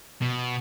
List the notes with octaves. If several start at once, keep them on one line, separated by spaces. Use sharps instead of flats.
B2